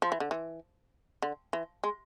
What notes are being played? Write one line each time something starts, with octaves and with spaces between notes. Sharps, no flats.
F3
E3
D3
E3
D3
E3
G#3